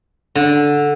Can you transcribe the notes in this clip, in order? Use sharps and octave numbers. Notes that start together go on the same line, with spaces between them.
D3